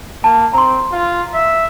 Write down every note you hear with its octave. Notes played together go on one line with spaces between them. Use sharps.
A#3 A5
C4 A#5 C6
F4
E5